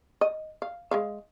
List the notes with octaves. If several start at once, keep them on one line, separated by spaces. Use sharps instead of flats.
D#5
F5
G#3 E5 F5